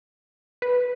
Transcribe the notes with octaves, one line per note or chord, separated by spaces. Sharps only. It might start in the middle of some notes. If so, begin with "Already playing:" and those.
B4